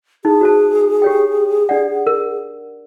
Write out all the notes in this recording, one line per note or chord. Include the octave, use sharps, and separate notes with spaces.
D#4 G#4
F#4 C5 A5
G4 C#5 G5
D4 D5 F#5
A#4